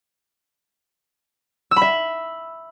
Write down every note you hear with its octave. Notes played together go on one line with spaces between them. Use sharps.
E6
B5
E5